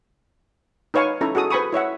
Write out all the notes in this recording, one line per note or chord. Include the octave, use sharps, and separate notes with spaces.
D#4 B4 C#5 F5 G#5 C#6
C#4 D#4 E4 A4 E5 A#5
F#4 G#4 A4 D#6
B4 C5 G#5 B5 C#6 D#6
E4 C#5 E5 F#5